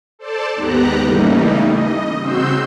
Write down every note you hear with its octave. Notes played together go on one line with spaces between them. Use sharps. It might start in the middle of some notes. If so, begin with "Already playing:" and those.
A4 C5 D5 A5
D#2 G#2 B3 G4 A#5 F#6
C#3 E3 G3 A3 A#3 D#4
D#5
C#3 C4 F#4 C6 E6 G6